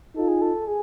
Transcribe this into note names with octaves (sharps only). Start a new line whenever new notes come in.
D#4 F4 A4
G#4
A4
G#4